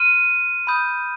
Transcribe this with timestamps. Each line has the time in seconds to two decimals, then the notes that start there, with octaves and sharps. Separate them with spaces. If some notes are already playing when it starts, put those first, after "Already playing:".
Already playing: C6 F6 D#7
0.67 B5 D#6 G6